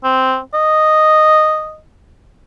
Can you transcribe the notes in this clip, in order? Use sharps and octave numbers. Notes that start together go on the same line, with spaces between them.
C4
D#5